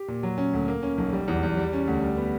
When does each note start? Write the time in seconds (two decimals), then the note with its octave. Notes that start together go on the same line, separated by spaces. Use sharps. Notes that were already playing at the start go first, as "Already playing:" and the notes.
Already playing: G4
0.08 A#2
0.23 F#3
0.38 C#4
0.53 D2
0.68 A#3
0.83 C#4
0.98 B1
1.13 G3
1.28 E2
1.43 E2
1.57 G3
1.73 C#4
1.87 D2
2.02 G3
2.18 B3